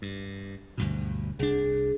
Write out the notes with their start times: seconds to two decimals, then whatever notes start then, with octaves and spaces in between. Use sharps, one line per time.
0.02 G2
0.78 D2 G2 B2
1.39 C2 D4 G#4